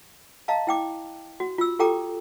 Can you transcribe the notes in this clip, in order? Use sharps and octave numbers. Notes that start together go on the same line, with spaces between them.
D#5 F5 A5 A#5
E4 G5 D6
F#4
F4 E6
F4 G4 A4 G5 A#5 D6